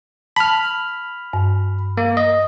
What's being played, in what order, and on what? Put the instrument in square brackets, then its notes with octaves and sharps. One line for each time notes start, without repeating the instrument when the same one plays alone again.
[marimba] A5 [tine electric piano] B5 F6
[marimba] G2
[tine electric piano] A#3
D#5